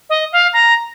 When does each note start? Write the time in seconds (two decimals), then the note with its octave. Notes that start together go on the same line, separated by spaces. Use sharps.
0.10 D#5
0.33 F5
0.53 A#5